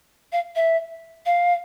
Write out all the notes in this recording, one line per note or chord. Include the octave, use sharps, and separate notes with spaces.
F5
E5
F5